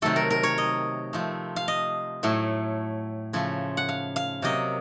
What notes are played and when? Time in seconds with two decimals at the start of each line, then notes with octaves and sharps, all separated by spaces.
0.02 C3 D#3 F#3 A3 A4
0.16 A#4
0.30 A#4
0.43 C#5
0.58 D#5
1.13 C3 F3 A3
1.56 F5
1.68 D#5
2.23 A2 F#3 A3
3.33 C#3 F3 A3
3.77 F#5
3.89 F5
4.16 F5
4.42 C3 F#3 A#3 D#5